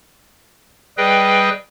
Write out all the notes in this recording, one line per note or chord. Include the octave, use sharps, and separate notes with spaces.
G3 G#4 B4 D#5 G5